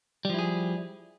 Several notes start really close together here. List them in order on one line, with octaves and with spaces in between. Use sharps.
G3 F3 E4 G#4